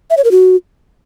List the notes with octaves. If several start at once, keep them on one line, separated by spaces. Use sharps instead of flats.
E5
C#5
A#4
F#4